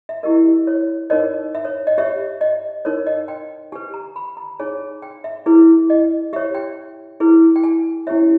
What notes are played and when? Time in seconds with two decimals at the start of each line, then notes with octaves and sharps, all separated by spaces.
0.09 E5
0.23 E4 G4 A#4 D#5
0.67 C#5
1.10 D#4 A#4 C#5 D#5
1.55 E5
1.65 C#5
1.87 D#5
1.98 G4 C#5 E5
2.41 D#5
2.85 D#4 A#4 C#5
3.07 D#5
3.28 G5
3.72 G4 B4 G#5
3.94 A#5
4.16 B5
4.37 A#5
4.60 D#4 G#4 C#5 G#5
5.02 G5
5.24 E5
5.46 E4 G#4 B4
5.90 D#5
6.33 G4 C#5 E5
6.55 G5
7.20 E4 G#4 B4
7.56 G5
7.64 G#5
8.07 C#4 E4 G4 C#5 E5